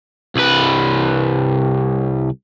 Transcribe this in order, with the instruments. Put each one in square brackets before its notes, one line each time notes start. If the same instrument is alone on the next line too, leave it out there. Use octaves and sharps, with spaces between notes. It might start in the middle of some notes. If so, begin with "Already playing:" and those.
[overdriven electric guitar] C2 B4